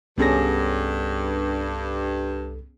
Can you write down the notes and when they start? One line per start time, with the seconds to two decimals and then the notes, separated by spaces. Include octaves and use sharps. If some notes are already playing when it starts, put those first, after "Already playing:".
0.18 C2 G2 B3 C#4 G#4 A4 A#6